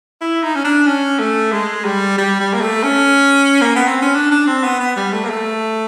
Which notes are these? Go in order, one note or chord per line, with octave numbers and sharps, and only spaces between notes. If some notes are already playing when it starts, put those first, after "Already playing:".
E4
D#4
C#4
D4
C#4
A3
G#3
G3
G3
G3
A#3
A3
C#4
A#3
B3
C4
C#4
D4
D4
C4
B3
B3
G3
A3
A#3
A3